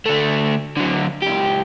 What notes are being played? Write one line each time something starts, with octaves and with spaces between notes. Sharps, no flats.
D3 A3
D3 F#3
C#2 G4